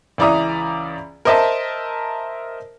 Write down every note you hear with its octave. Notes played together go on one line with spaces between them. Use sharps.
C#2 E3 D5 E5 A#5 D#6
A#4 C5 D#5 E5 A5